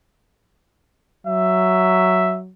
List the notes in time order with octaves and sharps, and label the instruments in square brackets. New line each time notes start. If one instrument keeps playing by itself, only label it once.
[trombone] F#3 [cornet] E5